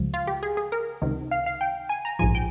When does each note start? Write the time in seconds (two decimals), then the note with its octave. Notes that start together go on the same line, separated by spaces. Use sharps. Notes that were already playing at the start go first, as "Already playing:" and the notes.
Already playing: C#2 C#3 F3
0.14 F4
0.27 G4
0.43 G#4
0.57 G#4
0.72 A#4
1.02 C#2 C3 D#3
1.31 F5
1.46 F5
1.61 G5
1.89 G#5
2.05 A#5
2.19 A#1 G#2 F3 G#5
2.35 G5